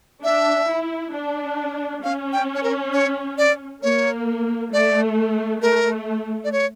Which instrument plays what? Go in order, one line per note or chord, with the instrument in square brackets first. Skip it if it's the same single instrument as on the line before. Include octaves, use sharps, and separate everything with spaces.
[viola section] D4 [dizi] E5
[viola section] E4
D4
[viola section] C#4 [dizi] F5
[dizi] G5
C#5
A#4
C#5
D5
[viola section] A#3 [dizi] C#5
[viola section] A3 [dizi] D5
[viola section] A3 [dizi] A#4
[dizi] D5
C#5